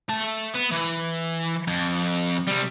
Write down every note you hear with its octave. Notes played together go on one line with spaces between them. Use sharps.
A3 A5
B3
E3
F2
C3 G3